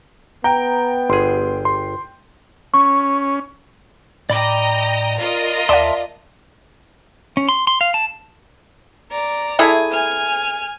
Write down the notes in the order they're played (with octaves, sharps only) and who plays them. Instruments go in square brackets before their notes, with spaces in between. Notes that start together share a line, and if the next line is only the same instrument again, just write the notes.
[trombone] B3 [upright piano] G5 [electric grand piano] A#5
[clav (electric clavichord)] G1 G#4 [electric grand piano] C6
[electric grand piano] C6
[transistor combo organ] C#4 [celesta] C#6
[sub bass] A2 [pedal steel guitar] D5 B5 D6 [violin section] D#5 G5 A#5
[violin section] F4 A#4 D#5
[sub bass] D#2 [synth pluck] D5 F5 [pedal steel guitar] E5 A5 C6
[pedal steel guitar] C#4
C6
C6
F5
A5
[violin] D5 A#5
[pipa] A3 E4 G#4
[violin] G#5 F6